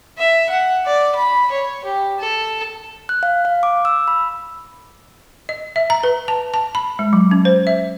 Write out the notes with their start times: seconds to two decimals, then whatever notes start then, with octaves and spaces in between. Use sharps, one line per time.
0.18 E5
0.50 F#5
0.86 D5
1.16 B5
1.52 C#5
1.84 G4
2.19 A4
3.09 F#6
3.23 F5
3.45 F5
3.63 D6
3.85 E6
4.08 B5
5.49 D#5
5.76 E5
5.90 A#5
6.03 B4
6.28 A5
6.54 A5
6.75 B5
6.99 G#3
7.13 F#3
7.31 C#4
7.45 C5
7.67 E5